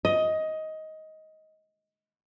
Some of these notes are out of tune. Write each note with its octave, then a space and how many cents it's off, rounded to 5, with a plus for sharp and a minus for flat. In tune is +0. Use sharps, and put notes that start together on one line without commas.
D#5 +15